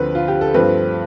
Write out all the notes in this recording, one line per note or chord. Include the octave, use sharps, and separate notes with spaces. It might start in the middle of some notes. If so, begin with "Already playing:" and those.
Already playing: D2 D3 F3 C4 B4
F4
G4
A4
G2 F3 A3 C4 B4